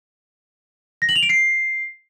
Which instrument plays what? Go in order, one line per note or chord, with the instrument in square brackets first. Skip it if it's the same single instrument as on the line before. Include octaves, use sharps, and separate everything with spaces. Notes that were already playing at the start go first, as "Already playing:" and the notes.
[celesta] A#6
F#7
F7
D7
C7